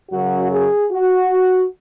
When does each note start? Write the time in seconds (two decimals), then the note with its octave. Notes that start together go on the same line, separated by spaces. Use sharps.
0.10 F#2 C#3 F#3 F#4
0.51 G#4
0.91 F#4